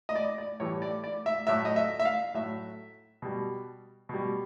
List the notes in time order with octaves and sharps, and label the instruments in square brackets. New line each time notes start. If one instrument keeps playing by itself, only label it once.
[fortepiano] D#5
D5
D5
A2 E3 G3 C#5
D5
D5
E5
A2 F#3 E5
D#5
E5
E5
F5
A2 F#3 E5
B2 G3
B2 G3